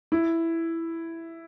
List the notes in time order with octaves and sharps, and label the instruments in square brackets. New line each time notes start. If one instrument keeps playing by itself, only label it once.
[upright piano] E4